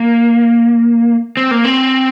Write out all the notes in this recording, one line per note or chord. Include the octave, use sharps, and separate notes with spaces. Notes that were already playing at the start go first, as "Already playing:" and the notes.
Already playing: A#3
C4
A#3
C4